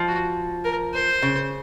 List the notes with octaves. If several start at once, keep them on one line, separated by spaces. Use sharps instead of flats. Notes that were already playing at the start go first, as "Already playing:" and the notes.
Already playing: F3
F#4
A#4
C5
C#3